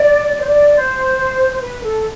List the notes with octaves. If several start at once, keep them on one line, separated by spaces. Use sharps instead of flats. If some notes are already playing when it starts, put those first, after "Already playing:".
Already playing: D5
D5
C5
D5
C5
C5
B4
A4